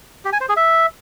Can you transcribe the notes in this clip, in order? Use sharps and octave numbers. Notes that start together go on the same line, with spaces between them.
G4
G#5
C5
G#4
E5